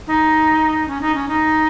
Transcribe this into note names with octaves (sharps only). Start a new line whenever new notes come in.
D#4
C#4
D#4
C#4
D#4